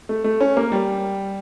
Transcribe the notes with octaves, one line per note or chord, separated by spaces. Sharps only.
A3
A3
C#4
A#3
G3